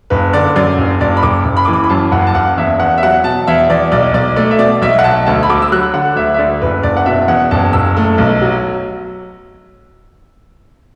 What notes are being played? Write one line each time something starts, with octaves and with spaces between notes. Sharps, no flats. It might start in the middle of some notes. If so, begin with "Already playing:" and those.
F#1 B4
D3 D5
F#2 D5
F#1
F#1 D5
B5
F#1 D6
F#1
B5
E3 D6
B5
B5
F#2 A5
F#1 F#5
A5
F#1 F#5
E2 E5
E2 F#5
E5
F#3 F#5
B2 A5
E2 E5
E2 D5
B1 D5
B1 D5
A3 D5
E5
B2 D5
B1 E5
F#5
B1 A5
D2 A5
B5
D2 D6
E6
F#3 F#6
D3 F#5
D2 E5
E5
D2 D5
F#1 B4
F#1 D5
F#5
B2 E5
E2 F#5
F#1 A5
F#1 E6
A3
B1
F#3